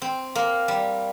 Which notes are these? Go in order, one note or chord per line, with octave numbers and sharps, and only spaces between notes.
C4
A#3
G3